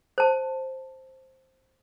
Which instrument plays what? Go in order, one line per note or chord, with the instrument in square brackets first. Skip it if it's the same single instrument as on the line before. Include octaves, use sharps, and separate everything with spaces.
[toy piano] C5 A5